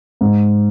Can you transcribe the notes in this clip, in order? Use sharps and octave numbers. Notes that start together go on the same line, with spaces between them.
G#2